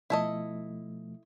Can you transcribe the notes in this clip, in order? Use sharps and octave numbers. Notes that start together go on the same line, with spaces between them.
B2 F3 A3 E4 A4 D#5